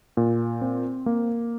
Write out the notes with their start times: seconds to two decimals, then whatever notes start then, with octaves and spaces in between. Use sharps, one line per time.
0.17 A#2
0.61 C4
1.06 A#3